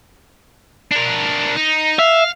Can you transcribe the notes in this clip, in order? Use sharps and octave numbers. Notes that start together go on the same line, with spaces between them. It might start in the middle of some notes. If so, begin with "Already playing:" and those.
D4 A#4
D#4
E5 F5